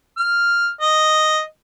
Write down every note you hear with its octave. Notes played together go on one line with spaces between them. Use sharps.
F6
D#5